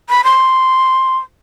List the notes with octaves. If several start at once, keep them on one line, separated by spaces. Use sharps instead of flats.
B5
C6